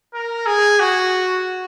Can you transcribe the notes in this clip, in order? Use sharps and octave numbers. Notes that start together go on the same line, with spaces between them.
A#4
G#4
F#4